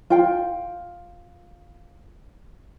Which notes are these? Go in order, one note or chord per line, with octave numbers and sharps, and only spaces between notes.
F4 G5